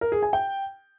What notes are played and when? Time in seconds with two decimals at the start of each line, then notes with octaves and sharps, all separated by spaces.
0.01 A#4
0.12 G#4
0.22 G#5
0.33 G5